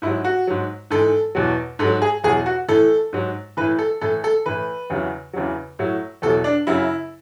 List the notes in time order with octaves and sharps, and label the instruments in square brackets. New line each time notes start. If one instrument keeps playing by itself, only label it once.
[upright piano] G#2 E4
F#3
F#4
G#2 F#3
G#2 E3 A4
E2 B2 F#3
G#2 A4
F#3
G#4
E2 B2 F#3 G#4
F#4
A2 E3 A4
G#2 F#3
E3 B4
A2
A4
A2 E3 A4
A4
A2 E3 B4
E2 C#3 F#3
E2 C#3 F#3
A2 F#3
E2 B2 F#3 A4
D4
F#2 C#3 F#3 E4